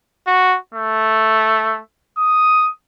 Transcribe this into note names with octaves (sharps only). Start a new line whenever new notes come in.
F#4
A3
D#6